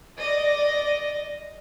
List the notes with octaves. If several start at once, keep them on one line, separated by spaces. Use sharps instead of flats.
D5 D#5